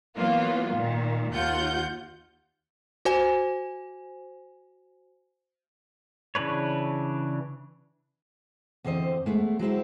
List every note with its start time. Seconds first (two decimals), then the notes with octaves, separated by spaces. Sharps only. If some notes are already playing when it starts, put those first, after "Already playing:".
0.16 E3 F#3 A#3 B3 F4
0.75 A#2 D#3
1.32 D#2 F4 F#5 G6
3.05 F#4 C5 G#5
6.35 C#3 E3 D4 B4 C#5
8.84 E2 D3 C4 C5 D#5
9.26 G#3 A3 B3
9.59 F#3 G#3 C4 E4